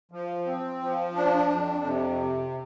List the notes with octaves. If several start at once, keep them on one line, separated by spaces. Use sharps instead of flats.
F3
C4
F3
D4
F2
C3